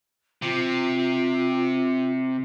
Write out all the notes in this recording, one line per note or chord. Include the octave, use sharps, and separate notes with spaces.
C3 F4